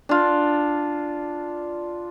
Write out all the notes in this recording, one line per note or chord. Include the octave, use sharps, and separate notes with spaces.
D4 F4